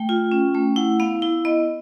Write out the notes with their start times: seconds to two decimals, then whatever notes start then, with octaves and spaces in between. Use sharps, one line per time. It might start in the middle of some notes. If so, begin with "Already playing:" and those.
Already playing: A3 G5
0.09 F4
0.32 C#4
0.55 A3
0.76 E4 F#5
1.00 B3 F5
1.22 E4
1.45 B3 D#5